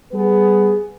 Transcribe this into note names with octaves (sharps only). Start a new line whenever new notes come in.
G3 B3 G#4 B4